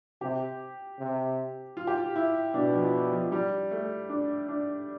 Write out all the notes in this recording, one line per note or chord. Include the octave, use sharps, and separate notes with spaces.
C3 G4
C3
F4
G4
F4
E4
B2 D4
F3
F3
G3
A3
D4
D4